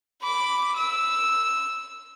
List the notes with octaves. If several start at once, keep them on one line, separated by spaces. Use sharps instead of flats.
B5 D6
E6